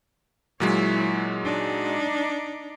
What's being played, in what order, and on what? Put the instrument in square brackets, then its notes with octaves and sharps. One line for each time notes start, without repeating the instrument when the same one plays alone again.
[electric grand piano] A#2 F#3 G#3 [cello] E4 C#5
[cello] D4 D#4